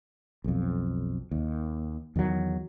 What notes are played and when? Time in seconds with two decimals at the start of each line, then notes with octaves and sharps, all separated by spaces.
0.44 B1 F2
1.31 D#2
2.16 E2 D#3 E3 F#3